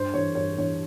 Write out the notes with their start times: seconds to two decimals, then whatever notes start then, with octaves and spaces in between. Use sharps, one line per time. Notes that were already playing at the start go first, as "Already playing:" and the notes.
Already playing: G2 C5
0.14 E3 C#5
0.35 G2 C#5
0.58 E3 C#5